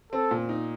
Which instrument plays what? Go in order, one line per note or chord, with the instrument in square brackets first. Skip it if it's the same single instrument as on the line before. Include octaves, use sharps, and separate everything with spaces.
[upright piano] C4 [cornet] A4
[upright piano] A#2
D#4